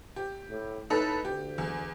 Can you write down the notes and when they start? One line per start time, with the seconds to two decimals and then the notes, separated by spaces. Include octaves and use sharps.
0.16 G4
0.49 A2
0.90 A2 D#4 A4 B4
1.25 D2 G4
1.58 E2